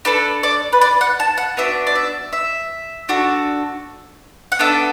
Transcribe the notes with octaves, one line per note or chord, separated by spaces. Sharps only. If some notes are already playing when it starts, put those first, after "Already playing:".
D4 A4 B4
D5
B4
D5
F#5
A5
F#5
B3 D4 F#4 E5
D5
E5
E5
D4 F#4 A4
F#5
B3 D4 A4 E5